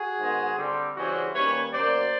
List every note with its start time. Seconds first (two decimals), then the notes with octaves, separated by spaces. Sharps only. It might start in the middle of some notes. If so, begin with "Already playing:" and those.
Already playing: F#4 G#4
0.19 G#2 D#3 G#3 B3
0.58 D3 G3 C4
0.96 C#3 E3 G3 C4 F#4 G#4
1.34 D#3 G3 A#3 C#4 B4 C#5
1.73 B2 F#3 A#3 C#4 C5 D5